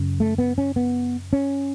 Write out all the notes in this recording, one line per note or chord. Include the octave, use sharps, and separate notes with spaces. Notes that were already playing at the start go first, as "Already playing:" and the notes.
Already playing: F#2 C#3
A3
B3
C#4
B3
C#4